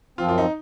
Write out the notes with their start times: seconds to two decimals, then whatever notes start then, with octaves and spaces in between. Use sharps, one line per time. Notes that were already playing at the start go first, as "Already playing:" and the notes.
0.18 F#2 F3 C4 F4
0.29 F4
0.38 D#4